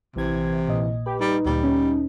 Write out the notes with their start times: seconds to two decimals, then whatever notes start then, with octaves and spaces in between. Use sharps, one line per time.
0.16 A#1 C3 E3 G#6
0.69 A#2 D#5
1.06 G4 B4
1.20 G3 D#4
1.46 D2 A#2 G3
1.63 C#4